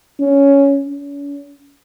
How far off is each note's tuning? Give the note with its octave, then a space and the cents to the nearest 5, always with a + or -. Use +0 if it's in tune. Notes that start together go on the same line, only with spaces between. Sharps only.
C#4 +5
C#4 +40